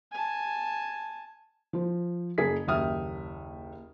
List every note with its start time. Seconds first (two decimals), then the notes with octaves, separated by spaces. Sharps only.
0.12 G#5 A5
1.73 F3 C5
2.38 F#1 G#4 B6
2.67 F#1 D#2 E5 G5 D#6 F6